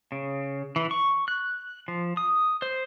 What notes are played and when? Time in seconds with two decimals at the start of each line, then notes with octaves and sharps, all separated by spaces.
0.12 C#3
0.76 E3
0.91 C#6
1.28 F#6
1.88 F3
2.17 D#6
2.62 C5